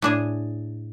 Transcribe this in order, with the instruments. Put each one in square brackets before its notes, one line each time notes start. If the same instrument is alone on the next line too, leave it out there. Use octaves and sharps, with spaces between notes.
[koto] A2 D4 G#4